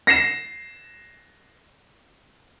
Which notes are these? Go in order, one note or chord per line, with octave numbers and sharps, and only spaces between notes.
A#6 C7 E7